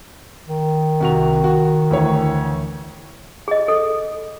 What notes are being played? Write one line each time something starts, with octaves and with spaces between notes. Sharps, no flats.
D#3
C2 F#4 F7
F#4
D2 E3 C#5
G#4 D#5
A4